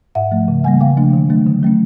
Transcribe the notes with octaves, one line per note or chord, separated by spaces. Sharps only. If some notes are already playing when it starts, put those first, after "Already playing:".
G#2 E5 F#5
F3 A3
C#3
E3 G3 A#3 F#5 G#5
C#3 F5 G5
F3 A3 D4
D#3
F#3 A3 D4
D3
F#3 A3 C#4